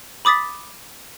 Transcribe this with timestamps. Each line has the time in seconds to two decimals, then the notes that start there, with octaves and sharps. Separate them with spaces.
0.25 B5 D6 D#6 A6 B6